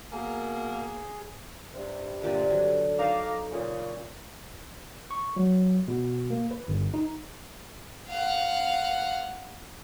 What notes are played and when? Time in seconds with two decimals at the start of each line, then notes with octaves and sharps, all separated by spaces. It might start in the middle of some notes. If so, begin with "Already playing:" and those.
0.12 B2 A#3 G#4
1.74 G2 C3
2.22 A#2 D3 G4 D5
2.50 F#3 A4
2.99 D#4 F5 A5 A#5 D6
3.52 A#2 C#3
5.11 C#6
5.36 F#3
5.88 B2
6.30 A#3
6.51 B4
6.68 G1
6.94 D#4
8.09 F5 F#5